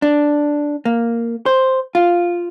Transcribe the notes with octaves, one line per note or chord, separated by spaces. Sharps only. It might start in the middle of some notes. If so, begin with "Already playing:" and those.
D4
A#3
C5
F4